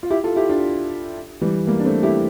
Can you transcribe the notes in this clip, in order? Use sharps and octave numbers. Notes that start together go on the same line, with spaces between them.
F4
E4 G4
F4 A4
E4 G4
D4 F4
E3 G3
G3 A#3
D4
A3 C4
E4 G4